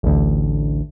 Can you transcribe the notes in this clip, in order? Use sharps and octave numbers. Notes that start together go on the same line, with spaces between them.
A1 D2